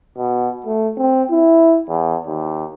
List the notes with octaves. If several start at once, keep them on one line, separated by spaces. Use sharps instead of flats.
B2
A3
C4
E4
E2
D#2